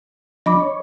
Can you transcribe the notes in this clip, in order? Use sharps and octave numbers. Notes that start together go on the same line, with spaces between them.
F3 D4 D#5 B5 D6
C#5